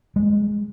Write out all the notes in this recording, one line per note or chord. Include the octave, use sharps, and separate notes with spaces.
G#3